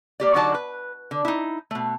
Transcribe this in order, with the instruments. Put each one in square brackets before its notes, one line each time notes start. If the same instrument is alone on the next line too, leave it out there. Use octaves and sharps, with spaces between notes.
[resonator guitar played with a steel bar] A#3 G4 D5
D3 F#3 D#4 F#4 D5 A5
B4
D3
D#4 E4
B2 A3